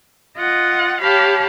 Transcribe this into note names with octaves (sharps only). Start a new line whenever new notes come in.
F4 D#5 F#5
G4 C#5 F5 A5 B5